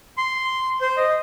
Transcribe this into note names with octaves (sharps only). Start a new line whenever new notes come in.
C6
C5
D#5